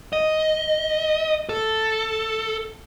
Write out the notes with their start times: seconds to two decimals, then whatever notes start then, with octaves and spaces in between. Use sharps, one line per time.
0.13 D#5
1.49 A4